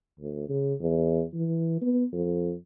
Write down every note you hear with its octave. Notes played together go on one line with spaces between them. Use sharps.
D2
C#3
E2
E3
B3
F2